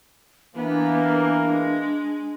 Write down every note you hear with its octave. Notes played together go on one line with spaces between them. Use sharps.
E3 A#3 B3 D4
G#3